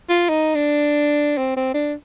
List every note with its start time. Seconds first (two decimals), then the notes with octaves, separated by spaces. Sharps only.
0.09 F4
0.29 D#4
0.55 D4
1.38 C4
1.57 C4
1.74 D4